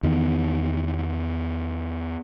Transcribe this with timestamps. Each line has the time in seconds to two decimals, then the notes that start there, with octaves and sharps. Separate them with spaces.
0.03 E2 D#3 B3